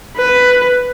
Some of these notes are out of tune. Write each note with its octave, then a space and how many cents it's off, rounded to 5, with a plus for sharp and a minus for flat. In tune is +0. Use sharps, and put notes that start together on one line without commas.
B4 +5